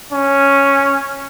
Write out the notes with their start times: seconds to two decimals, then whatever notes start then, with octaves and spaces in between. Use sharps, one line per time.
0.12 C#4